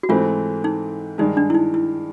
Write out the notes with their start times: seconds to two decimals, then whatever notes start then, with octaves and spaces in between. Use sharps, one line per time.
0.03 F#4
0.09 G#2 E3 A3 C4 F4
0.64 D#4
1.18 G2 D#3 G#3 D#4
1.37 D4
1.50 E4
1.55 D#4
1.74 E4